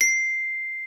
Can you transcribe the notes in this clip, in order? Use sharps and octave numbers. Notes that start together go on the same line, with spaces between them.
C7